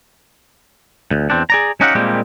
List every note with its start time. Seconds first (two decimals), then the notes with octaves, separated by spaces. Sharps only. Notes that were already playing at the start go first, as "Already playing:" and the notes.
1.11 D2
1.30 E2 C4 D4
1.50 G#4 D5 A#5
1.81 C#4 D#4 F#4 G4 F5 F#5
1.95 A#2 G3 G#3 A#3 C4 G4